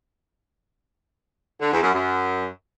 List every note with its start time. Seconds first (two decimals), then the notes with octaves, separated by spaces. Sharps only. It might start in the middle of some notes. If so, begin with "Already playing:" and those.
1.60 D3
1.71 E2
1.82 F#2
1.93 F#2